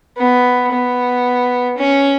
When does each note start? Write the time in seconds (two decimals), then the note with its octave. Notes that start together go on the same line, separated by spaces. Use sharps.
0.18 B3
0.72 B3
1.77 C#4